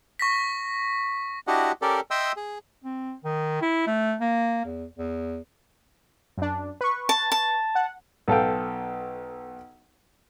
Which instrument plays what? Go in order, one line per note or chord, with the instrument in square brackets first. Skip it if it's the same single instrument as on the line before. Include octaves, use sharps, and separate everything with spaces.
[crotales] C#6 A#6 B6
[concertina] D4 E4 F#4 G4 D#5 F#5
C#4 G4 A4 A#4 D5
D#5 E5 G5 C6 D#6 E6
G#4
[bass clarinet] C4
D#3
E4
A3
A#3
E2
E2
[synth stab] F#2 D4
B4 C#6
[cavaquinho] A5
A5
[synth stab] F#5
[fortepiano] B1 A4 F5 G5